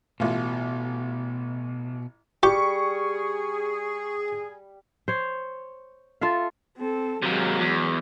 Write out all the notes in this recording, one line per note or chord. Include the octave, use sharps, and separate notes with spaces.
A1 B2 F4
G3 G4 G#4 C#6
C5 C#5
F4 A4 E5 F5
C4 A4
C3 F#3 G#3 A#3
E2